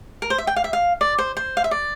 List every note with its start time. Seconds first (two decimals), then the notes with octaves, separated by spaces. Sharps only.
0.22 A#4
0.30 C5
0.38 E5
0.47 G5
0.56 F5
0.64 E5
0.73 F5
1.01 D5
1.18 C5
1.37 C5
1.57 F5
1.64 E5
1.71 D5